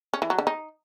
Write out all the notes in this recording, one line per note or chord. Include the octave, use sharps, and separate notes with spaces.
C#4
E3
F#3
D3
D#4